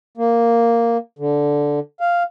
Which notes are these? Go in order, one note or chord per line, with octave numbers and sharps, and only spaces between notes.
A#3
D3
F5